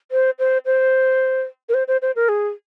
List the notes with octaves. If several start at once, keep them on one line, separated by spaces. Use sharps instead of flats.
C5
C5
C5
A#4
C5
C5
C5
A#4
G#4